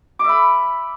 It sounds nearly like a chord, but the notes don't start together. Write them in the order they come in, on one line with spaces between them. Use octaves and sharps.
D6 E5 B5